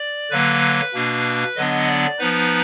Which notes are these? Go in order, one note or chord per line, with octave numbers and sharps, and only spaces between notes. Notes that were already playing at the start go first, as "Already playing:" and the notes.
Already playing: D5
D3 F#3 A#3 B4
B2 A#3 D4
D3 F#3 B3 D4 D#5
D5
F3 B3 D#4 B4